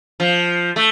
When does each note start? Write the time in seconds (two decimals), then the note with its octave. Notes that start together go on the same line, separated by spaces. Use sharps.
0.20 F3
0.76 A3